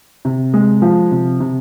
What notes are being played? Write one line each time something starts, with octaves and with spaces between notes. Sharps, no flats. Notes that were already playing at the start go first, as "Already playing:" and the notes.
C3
G#3
F3
C3
C3